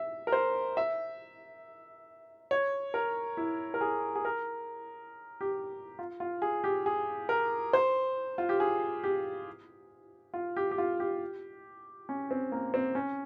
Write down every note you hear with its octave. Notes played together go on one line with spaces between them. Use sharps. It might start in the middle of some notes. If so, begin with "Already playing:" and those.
Already playing: E5
A#4
C5
E5
C#5
A#4
E4
A#4
G#4
G#4
A#4
G4
F4
F4
G#4
G4
G#4
A#4
C5
F4
G4
G#4
G4
F4
G4
G4
F4
G4
C#4
C4
A#3
C4
C#4